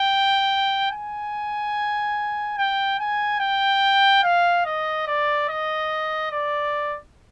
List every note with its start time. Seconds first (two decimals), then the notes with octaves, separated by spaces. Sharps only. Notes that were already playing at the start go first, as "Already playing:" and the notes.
Already playing: G5
0.91 G#5
2.58 G5
2.99 G#5
3.40 G5
4.23 F5
4.65 D#5
5.07 D5
5.49 D#5
6.32 D5